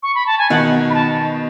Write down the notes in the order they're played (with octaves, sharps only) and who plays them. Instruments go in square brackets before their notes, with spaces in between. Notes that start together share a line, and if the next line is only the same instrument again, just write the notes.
[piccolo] C#6
B5
A5
G#5
[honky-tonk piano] B2 D#3 [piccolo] F#5
[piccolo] B5
A5